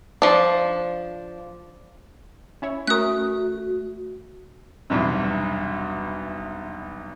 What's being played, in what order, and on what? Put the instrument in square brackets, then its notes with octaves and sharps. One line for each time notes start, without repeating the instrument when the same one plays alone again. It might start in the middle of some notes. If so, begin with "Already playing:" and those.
[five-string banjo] F3 D4
[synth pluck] C#4 E4 C#5
[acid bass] A3 [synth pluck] C#4 A#4 [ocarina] F#4 [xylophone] D#6 F#6
[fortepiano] B1 E2 G2 C3